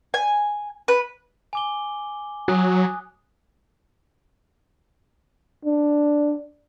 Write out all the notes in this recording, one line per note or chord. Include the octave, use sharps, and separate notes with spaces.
G#5
B4
G#5 D6 G7
F#3 G#5 D#6 F#6
D4